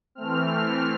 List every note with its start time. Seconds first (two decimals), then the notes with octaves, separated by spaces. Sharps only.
0.15 E3 A3 C4 F6